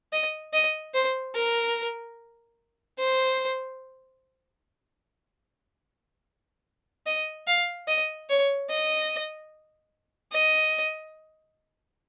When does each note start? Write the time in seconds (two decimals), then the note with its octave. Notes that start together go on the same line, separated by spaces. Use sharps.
0.13 D#5
0.53 D#5
0.95 C5
1.35 A#4
2.99 C5
7.06 D#5
7.47 F5
7.88 D#5
8.29 C#5
8.70 D#5
10.32 D#5